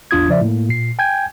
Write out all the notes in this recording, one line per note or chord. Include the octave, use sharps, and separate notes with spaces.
G#1 E2 D4 F4 D#6 G#6
C#3 F3 D5 E5
A2 A#3
A#2 C7
G5 G#5 G6 G#6